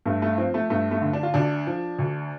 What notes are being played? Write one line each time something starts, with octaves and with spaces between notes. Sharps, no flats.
G2 A3
A3
F3 C4
A3
G2 A3
A3
D3
D4
F4
D2 D4
F3
D2